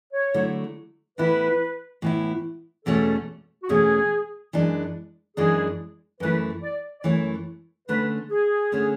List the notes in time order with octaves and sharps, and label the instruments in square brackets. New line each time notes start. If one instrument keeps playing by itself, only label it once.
[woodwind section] C#5
[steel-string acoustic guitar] D3 F#3 A3 E4
[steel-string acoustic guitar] A2 E3 B3 E4 [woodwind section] B4
[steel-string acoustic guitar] A2 E3 B3 E4
[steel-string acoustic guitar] E2 B2 A3 C#4 [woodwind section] A4
[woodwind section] F#4
[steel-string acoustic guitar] E2 B2 A3 C#4 [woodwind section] G#4
[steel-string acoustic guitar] F#2 E3 G#3 D4
[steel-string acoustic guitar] F#2 E3 G#3 D4 [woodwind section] G#4
[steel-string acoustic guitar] F#2 E3 A3 E4 [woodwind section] B4
[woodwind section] D5
D5
[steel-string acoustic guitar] F#2 E3 A3 E4 [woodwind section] C#5
[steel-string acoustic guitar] D3 A3 C#4 [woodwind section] B4
[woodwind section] G#4
[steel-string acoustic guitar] D3 A3 C#4